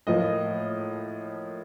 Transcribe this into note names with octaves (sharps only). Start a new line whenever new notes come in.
A2 F3 A#3 D#5